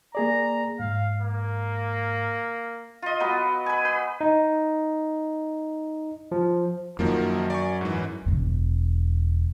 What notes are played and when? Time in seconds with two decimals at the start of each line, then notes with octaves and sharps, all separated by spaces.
0.15 A#3 G#4 D5 A#5
0.80 G#2 F5
1.21 A#3
3.02 F4 D#5
3.20 F#3 B3 B4
3.66 B4 G#5
3.85 B4
4.21 D#4
6.32 F3
6.99 F#2 D#3 F3 A#3
7.50 D5 G#5 C#6
7.81 G#2 E3
8.26 E1 F#2